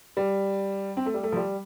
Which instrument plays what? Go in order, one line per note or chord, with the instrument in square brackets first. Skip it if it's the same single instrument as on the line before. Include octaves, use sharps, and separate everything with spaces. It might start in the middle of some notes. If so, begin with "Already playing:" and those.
[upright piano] G3
C4
A3
G3
A3
F3
G3